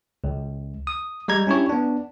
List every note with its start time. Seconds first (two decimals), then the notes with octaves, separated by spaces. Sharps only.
0.24 C#2
0.87 D#6
1.28 G3 G#3 A#5 G#6
1.47 C#4 D4 E4 G4 C#5
1.70 B3 D4